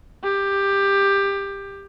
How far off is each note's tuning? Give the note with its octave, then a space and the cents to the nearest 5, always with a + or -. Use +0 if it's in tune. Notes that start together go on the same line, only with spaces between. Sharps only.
G4 +15